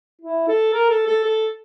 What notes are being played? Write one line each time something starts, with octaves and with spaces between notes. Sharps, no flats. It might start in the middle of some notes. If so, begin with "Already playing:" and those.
E4
A4
A#4
A4
A4
A4